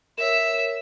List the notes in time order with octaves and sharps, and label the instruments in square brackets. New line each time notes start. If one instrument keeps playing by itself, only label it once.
[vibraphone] A#4 C#5 [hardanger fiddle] E5 [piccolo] E7